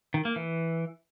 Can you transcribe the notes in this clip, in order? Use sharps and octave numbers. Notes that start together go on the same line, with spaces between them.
D#3
A#3
E3